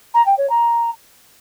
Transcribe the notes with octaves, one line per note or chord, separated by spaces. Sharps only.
A#5
G5
C#5
A#5